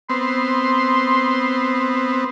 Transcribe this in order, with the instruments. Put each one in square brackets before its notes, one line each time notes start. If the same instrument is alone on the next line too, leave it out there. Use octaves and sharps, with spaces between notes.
[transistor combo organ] B3 C4 [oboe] C6